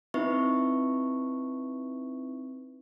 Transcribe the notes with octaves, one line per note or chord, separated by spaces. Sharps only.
C4 D#4 E4 B4 E5 C#6